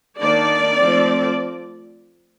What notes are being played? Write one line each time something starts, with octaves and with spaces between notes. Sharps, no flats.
D#3 A#3 D4 D5
F3 A3 C4